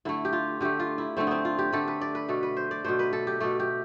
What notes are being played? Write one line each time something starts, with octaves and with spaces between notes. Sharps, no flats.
D3 A3 E4
G4
F4
D3 A3 G4
F4
E4
D3 A3 C4
B3 C4
F4
G4
D3 A3 A4
B4
D5
B4
B2 A3 A4
B4
C5
D5
B2 A3 C5
B4
A4
G4
B2 A3 A4
G4